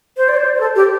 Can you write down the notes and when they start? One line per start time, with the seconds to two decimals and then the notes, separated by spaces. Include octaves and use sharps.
0.17 C5
0.29 D5
0.37 C5
0.44 D5
0.55 C5
0.60 A4
0.76 G4